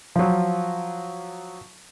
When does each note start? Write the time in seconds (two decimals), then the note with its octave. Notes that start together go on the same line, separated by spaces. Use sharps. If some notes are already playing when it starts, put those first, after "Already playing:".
0.16 F3 F#3